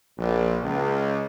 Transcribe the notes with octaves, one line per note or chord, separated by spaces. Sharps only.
A#1
C#2